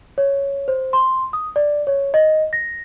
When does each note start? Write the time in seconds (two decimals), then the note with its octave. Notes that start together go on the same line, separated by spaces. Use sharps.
0.18 C#5
0.68 C5
0.93 C6
1.33 D#6
1.56 D5
1.87 C#5
2.14 D#5
2.53 A#6